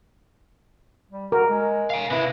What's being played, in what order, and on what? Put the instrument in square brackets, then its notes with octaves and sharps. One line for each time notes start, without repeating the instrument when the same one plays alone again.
[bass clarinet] G3
[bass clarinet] F#4 [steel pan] A#4
[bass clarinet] G#3
[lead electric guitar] F5 G#5
[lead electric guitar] C3 E4 [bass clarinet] B4